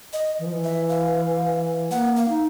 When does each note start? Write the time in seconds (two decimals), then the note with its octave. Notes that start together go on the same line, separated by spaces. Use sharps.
0.13 D#5
0.39 E3
0.46 F3
0.54 E3
0.64 E5
0.89 F5
1.91 A#3 F#5
2.16 F5
2.29 D#4